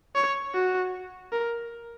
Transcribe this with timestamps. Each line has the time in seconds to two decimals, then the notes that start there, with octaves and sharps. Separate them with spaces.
0.15 C#5
0.54 F#4
1.32 A#4